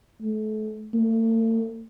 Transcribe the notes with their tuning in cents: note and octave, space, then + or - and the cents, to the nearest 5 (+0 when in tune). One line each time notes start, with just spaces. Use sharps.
A3 -35
A3 +45